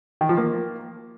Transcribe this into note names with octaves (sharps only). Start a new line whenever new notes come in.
D#3
F3
A#3